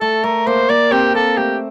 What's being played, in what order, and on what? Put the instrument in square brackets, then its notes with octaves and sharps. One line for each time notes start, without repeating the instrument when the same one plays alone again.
[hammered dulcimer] A3 [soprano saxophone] A4
[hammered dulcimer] A3 [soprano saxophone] A#4
[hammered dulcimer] A#3 [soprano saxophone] C5
[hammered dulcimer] A#3 [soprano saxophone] D5
[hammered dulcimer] C4 [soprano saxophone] G4
[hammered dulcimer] A#3 [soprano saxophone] A4
[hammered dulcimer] A3 [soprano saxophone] G4